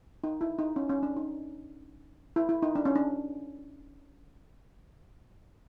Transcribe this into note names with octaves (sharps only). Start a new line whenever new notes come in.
D#4
E4
D#4
C#4
C#4
D4
D#4
E4
E4
D#4
D4
C#4
D4